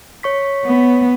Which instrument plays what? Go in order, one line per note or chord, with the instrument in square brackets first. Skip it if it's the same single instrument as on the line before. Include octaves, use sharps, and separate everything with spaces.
[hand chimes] C#5 C#6 B6
[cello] B3